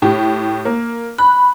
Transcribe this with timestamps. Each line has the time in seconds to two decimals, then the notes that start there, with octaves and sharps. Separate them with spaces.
0.02 A2 G4
0.65 A#3
1.18 B5 F#6